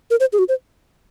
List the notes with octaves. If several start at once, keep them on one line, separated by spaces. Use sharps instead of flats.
A#4
C5
G#4
F#4
C5